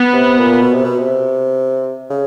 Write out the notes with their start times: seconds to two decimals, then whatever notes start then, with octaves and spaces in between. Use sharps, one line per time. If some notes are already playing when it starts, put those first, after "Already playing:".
Already playing: B3
0.13 C3
0.38 A#2
0.62 B2
0.73 C3
0.85 B2
0.99 C3
2.10 C#3